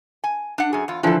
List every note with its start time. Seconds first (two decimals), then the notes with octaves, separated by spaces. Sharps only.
0.24 G#5
0.58 D4 F#5
0.73 F#2 G#4
0.88 E2 F4
1.03 A#2 D3 E3 F3 A4